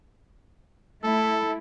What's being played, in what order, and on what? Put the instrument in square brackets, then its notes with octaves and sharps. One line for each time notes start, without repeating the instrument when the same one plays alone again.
[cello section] A3 E4 [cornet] A4